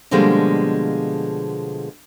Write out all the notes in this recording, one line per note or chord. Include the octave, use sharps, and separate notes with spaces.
B2 D3 F3 G3 G#3 A#3